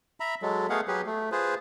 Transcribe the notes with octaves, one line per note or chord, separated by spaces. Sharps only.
E5 A#5 B5
F#3 G#3 A4
A3 B3 G#4 A#4 F5 F#5
F#3 G4 G#4 B4
A3
F4 G#4 B4 C5